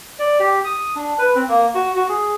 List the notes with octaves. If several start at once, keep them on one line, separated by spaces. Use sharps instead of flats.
D5
G4
D#6
D4
B4
C4
A#3
F#4
F#4
G#4